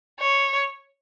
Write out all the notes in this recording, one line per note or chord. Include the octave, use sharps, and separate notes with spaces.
C#5